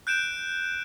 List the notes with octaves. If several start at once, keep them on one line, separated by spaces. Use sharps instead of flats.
F#6 G6 D7 E7